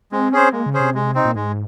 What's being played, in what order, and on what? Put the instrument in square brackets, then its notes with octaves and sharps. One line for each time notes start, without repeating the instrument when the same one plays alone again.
[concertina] G#3 [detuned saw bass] C4
[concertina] C#4 G#4 C5
[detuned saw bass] C4
[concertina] G#3 [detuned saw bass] A#3
[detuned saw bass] C#3
[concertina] C#4 G#4 C5
[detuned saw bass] C3
[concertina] G#3
C4 D#4
[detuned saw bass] A#2
[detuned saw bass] G#2 [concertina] G#3